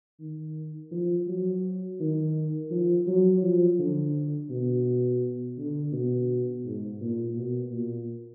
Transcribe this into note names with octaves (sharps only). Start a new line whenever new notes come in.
D#3
F3
F#3
D#3
F3
F#3
F3
D3
B2
D3
B2
G#2
A#2
B2
A#2